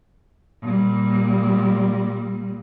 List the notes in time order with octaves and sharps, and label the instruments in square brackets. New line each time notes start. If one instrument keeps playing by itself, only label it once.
[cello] A#2 G3